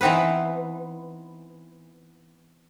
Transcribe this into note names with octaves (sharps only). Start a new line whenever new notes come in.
E3 B3 C4 D#4 B4